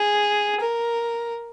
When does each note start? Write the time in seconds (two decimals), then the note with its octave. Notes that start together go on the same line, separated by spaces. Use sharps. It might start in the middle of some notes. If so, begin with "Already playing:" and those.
Already playing: G#4
0.61 A#4